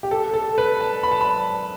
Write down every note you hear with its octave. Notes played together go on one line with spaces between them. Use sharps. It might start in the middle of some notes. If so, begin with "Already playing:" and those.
G4
A4
A4
B4
A5
B5
A5
B5